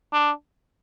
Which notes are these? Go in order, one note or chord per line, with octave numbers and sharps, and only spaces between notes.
D4